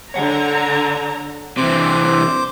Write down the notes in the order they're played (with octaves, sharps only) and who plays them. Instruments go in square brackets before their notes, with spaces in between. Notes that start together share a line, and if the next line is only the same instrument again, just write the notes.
[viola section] D3 A#5 [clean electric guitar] C#5 F#5 G#5
[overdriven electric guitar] C3 E3 [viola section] C4 D4 [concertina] C5 D6